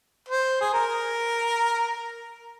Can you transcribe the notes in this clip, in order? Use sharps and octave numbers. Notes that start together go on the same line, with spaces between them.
C5
G#4
A#4